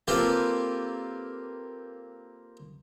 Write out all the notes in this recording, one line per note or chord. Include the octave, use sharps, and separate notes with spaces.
A#3 C4 F4 G4 A4 B4